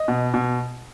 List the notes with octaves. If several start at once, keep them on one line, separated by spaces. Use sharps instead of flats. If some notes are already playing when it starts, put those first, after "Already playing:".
Already playing: D#5
B2
B2